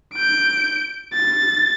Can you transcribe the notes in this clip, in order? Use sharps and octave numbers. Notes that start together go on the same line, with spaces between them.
G6 D7
A6